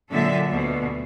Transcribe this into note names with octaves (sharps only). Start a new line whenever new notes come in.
A#2 D3 F#3 G#3 A4 E5
D2 B2